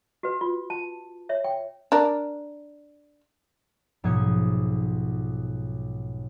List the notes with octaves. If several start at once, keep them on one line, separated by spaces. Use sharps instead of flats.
F#4 B4
F4
A5
C#5 E5
G5
D4 A#4
B1 G#2 F3 D#6 G#6 C#7